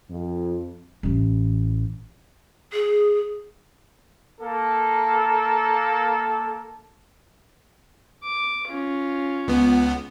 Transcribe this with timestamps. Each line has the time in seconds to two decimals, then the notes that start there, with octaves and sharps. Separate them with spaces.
0.10 F2
1.03 A1 E3
2.72 G#4
4.41 A#3 A4
8.23 D6
8.68 C#4 F4
9.48 C#2 B3